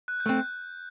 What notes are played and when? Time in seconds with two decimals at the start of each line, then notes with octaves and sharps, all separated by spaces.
0.08 F#6
0.20 G6
0.26 A3 C4 F#6